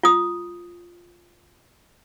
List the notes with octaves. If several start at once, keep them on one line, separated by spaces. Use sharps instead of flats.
F4 D#6